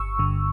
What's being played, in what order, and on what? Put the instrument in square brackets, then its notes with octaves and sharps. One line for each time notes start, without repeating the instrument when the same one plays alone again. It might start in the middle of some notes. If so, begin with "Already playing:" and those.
Already playing: [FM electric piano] G1 C#6 E6
G2 D3